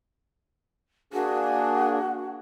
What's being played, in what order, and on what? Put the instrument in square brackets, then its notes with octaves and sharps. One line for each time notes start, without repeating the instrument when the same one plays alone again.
[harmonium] A#3 D4 G#4 [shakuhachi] F#4